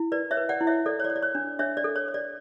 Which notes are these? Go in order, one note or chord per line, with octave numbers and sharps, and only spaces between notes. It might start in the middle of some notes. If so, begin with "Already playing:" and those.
Already playing: E4
B4 D5
C#5 E5
B4
D5 F#5
E4
C#5 E5
A4 D5
C#5
D5
C#5
D5
C#5
D4
D4 C#5 E5
D5
A4
C#5
C#5
D5